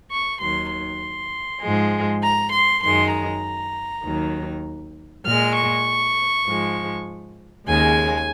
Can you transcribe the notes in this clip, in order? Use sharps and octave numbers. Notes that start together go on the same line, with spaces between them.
C#6
D#2 D#3 F#3 C6
C6
G#2 F3 G#3
A#5
C6
F#2 D#3 G#3 C6
A#5
D#2 D#3 F#3
A#2 G#3 F6
C#6
G#2 F3 G#3
D#2 C#3 G#3 G#5